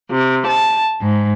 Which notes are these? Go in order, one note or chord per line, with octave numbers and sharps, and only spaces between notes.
C3
A5
G#2